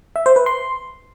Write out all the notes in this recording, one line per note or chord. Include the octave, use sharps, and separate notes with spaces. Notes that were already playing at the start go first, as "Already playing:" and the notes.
E5
C5
B4
C6